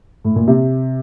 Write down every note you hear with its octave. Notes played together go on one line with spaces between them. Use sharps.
A2
A#2
C3